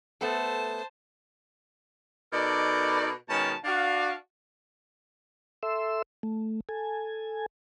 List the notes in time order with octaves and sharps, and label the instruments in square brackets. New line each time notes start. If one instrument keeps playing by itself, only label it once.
[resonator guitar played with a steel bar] A3 B3 A4 [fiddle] C5 A5
[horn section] B2 D#4 A4 A#4 D5
B2 D#3 G#3 C#4 A5
D4 F#4 F5
[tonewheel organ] A4 E5 C6 E6
A3
A4 G#5